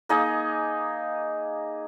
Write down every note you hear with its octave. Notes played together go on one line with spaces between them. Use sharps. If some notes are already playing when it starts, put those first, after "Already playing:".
A#3 D#4 G#4 D#5